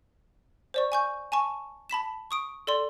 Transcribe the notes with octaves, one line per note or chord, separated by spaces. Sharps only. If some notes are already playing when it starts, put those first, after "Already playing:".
C5 D5 C#6
G#5 C#6 G6
G#5 A5 C#6
A5 B5 B6 E7
C#6 D#6 D7
A4 D5 C6